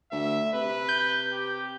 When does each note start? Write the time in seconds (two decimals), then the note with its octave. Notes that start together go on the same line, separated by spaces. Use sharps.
0.12 D2 E5
0.53 C3 B4
0.89 G6
1.32 G4